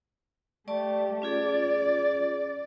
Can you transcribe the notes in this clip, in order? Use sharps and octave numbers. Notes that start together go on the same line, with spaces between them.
A3 G4 D5 A5 C#6
C#4 F4 G#4 D5